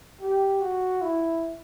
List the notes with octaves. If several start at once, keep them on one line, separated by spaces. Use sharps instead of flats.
G4
F#4
E4